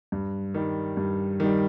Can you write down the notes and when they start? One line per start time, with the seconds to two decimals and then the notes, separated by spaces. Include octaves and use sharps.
0.12 G2
0.54 D#3 G3
0.97 G2
1.40 D#3 G3